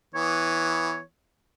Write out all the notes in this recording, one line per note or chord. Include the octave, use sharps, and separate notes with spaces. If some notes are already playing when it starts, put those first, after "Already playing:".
E3 B3 C#5